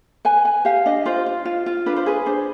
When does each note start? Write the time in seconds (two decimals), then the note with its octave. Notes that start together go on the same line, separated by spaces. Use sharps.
0.25 B4 G#5
0.45 B4 G#5
0.65 G4 F5
0.86 D4 D#5
1.05 F4 C5
1.26 F4
1.45 F4
1.66 F4
1.86 D4 B4
1.96 C5
2.06 G#4 B4
2.26 D4 C5